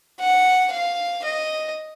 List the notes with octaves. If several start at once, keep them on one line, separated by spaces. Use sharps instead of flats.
F#5
F5
D#5